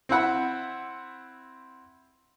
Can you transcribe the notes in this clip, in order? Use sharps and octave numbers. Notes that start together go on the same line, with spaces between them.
C4 E4 F#5 B5